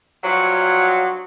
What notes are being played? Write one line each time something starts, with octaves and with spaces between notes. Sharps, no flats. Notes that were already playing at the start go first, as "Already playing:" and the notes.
G2 F3 F#3